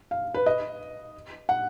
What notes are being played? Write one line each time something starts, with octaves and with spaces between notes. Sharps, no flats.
F5
B4
D#5
F#5